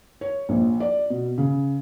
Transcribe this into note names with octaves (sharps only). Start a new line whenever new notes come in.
C#5
A#1
D5
B2
C#3